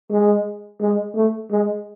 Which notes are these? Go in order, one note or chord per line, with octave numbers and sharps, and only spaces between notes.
G#3
G#3
A3
G#3